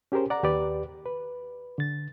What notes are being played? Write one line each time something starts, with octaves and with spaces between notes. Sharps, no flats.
C#4 G4 G#4 A#4 C5
D5 F#5 A#5
D#2 G4 B4 D5
B4
D3 A6